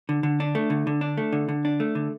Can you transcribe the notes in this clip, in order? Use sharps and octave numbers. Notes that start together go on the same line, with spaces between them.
D3
D3
D4
A3
D3
D3
D4
A3
D3
D3
D4
A3
D3